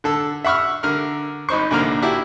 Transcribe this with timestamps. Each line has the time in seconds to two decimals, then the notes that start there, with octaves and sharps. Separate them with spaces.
0.04 D3 A4 E6
0.44 E5 F#5 C#6 E6 F6
0.83 D3 A#4 F6
1.49 G#1 D#4 C5 C#6
1.71 A#1 D3 A#3 A#5 F6
2.02 D4 E4 F#4 G4